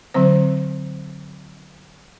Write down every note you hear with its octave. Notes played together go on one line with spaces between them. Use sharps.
D3 F#3 C4 C5